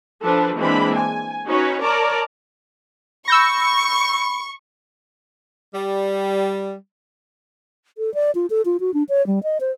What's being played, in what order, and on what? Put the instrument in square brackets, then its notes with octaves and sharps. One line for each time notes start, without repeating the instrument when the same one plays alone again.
[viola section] F3 D4 A4 B4
E3 G#3 A#3 C4 D4 B5
G#5
C#4 D#4 F#4 B4 C#5
A#4 C#5 D5 A5 A#5
[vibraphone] B5 [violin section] C#6 [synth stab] E6 G6 A#6
[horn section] G3
[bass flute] A4
D5
F4
A4
F4
F#4
D4
C#5
G3
D#5
C5